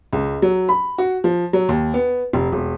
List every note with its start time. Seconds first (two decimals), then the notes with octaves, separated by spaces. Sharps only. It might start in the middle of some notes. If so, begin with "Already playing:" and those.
0.13 C#2
0.42 F#3
0.69 B5
0.98 F#4
1.24 F3
1.53 F#3
1.69 D#2
1.94 B3
2.33 F1
2.52 E1